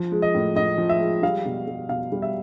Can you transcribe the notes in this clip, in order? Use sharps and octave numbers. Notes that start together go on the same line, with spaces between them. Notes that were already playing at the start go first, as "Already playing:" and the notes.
Already playing: F3
G#3
D#5
A2
A2 D#5
F3
E5
G#3
G3 F5
B2
G3
B2 F5
G3
E5